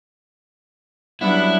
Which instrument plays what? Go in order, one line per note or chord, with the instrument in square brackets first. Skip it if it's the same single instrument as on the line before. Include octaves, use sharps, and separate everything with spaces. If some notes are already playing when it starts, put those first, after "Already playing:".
[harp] F#3 G3 C#4 [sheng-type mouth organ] B3 D4 F#5 [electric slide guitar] E4